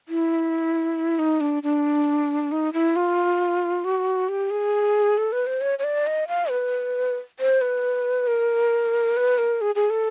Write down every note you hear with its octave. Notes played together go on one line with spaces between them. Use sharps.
E4
D#4
D4
D4
D#4
E4
F4
F#4
G4
G#4
A4
B4
C5
C#5
C#5
D5
D#5
F5
B4
C5
B4
A#4
B4
A#4
G#4
G#4
A4